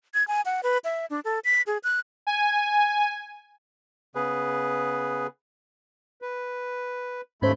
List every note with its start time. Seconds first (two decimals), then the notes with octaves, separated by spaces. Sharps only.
0.14 G#6
0.28 G#5
0.46 F#5
0.63 B4
0.84 E5
1.10 D4
1.25 A4
1.45 B6
1.67 G#4
1.84 F#6
2.27 G#5
4.15 C#3 B3 G#4 B4
6.22 B4
7.42 D#2 G#2 A3 C#4 C5 B5